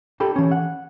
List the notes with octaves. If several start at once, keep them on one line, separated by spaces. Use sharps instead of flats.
D4 G4 A4 G5 A5 B5
E3 C#4
F#5